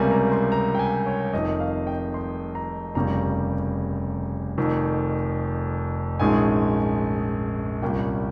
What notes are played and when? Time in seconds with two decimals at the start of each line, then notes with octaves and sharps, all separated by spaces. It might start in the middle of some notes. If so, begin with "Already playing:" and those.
Already playing: C#2 C3 G3 A#3 C#4 G#5 A#5
0.11 A#5
0.32 C6
0.52 A#5
0.75 G5
0.79 G#5
1.06 C#5
1.33 F1 F2 C3 D#3 D#5
1.60 F5
1.87 G5
2.14 C6
2.55 A#5
2.95 F1 D#2 C#3 G3 C#4 A#5
4.58 F1 F2 D#3
6.20 A#1 G#2 D#3 G#3 C#4 G#5
7.82 C2 A#2 G3 C#4 G5